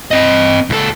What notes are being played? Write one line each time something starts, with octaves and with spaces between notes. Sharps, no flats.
C4 D#5
C#2 A4